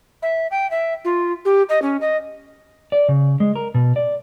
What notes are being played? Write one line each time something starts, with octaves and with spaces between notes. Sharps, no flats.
E5
G5
E5
F4
G4
D#5
C#4
D#5
D5
C#3
G#3
A#4
B2
D5